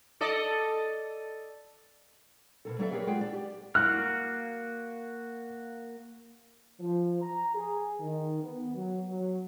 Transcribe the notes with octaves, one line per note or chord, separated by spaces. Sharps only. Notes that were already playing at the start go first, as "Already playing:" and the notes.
A4 D5 D#5
B2 A#3 A4
F#3 A#3 B3 A4 D5 E5
G4 G#4 A#4 B4 C#5
G#3 F4 G#4 F#5 G5
D4 D5
G4
A#3 F#4 F6 F#6
F3
A#5
G#4
D#3
B3
F#3
F#3